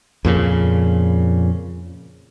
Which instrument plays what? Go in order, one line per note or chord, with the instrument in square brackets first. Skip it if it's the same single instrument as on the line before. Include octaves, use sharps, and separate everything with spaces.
[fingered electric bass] F2 A#2 C#3